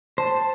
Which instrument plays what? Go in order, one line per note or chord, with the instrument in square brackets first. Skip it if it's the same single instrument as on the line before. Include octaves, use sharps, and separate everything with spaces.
[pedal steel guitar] C5 [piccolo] A5